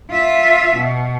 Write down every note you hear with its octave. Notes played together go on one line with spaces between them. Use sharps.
F4 E5
B2